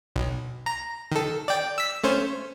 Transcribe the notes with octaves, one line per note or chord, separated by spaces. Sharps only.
B1
A#5
D#3 A4
D5 G5
E6 B6
A3 C#4 C5